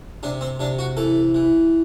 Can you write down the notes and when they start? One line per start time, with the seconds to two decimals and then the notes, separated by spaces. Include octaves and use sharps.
0.23 C3 D4
0.41 C4
0.60 C3 D4
0.79 F#4
0.97 E3 A4
1.35 E3